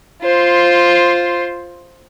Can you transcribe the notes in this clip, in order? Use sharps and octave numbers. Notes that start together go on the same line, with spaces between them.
F4 C5